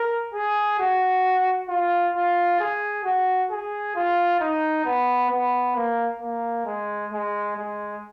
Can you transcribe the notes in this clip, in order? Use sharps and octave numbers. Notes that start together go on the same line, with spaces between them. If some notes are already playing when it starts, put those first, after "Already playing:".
Already playing: A#4
G#4
F#4
F4
F4
G#4
F#4
G#4
F4
D#4
B3
B3
A#3
A#3
G#3
G#3
G#3